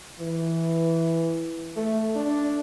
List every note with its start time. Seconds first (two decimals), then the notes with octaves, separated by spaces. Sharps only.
0.20 E3
1.76 A3
2.15 D4